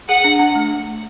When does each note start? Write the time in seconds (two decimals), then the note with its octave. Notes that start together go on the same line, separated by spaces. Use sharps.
0.09 G#4 F#5
0.24 D4
0.40 D4
0.55 A3